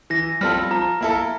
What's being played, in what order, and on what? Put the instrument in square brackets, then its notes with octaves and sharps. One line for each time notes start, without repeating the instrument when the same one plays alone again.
[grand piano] E3 [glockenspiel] A#6
[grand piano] G3 C4 F4 A4 [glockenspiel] F6
[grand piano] F3 [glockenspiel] A#5
[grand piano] A#3 E4 A4 [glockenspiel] A#5